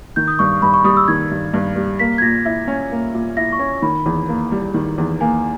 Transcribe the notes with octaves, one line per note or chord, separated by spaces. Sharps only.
D#3 G6
D#6
G2 C#6
G2 B5
C#6
G3 D#6
E6
D#3 G#6
G2
G2
G3
A#3 B6
G#6
A#2 A#6
E4
C#4
A#3
A#2
E4 A#6
C#6
C#4
D#3 B5
E2
A#3
G3
D#3
E2
A#3 G#5